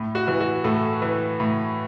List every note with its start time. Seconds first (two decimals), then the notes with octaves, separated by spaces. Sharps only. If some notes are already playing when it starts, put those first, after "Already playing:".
Already playing: A2
0.15 F#4
0.27 E3
0.40 F#4
0.64 A2 A4
1.02 E3
1.40 A2